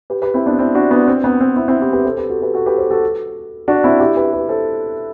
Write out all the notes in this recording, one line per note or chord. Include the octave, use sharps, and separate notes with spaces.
G4 B4
G4 B4
C4 E4
B3 D4
C4 E4
D4 F#4
B3 D4
C4
B3
C4
C4 E4
C4 E4
E4 G4
G4 B4
A4 C5
G4 B4
F#4 A4
G4 B4
F#4 A4
G4 B4
A4 C5
F#4 A4
D4 F#4
C4 E4
E4 G4
G4 B4
G4 B4
A4 C5